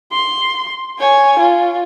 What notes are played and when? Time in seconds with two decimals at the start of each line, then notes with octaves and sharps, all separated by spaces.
0.13 C6
0.99 C#5 G#5
1.39 F4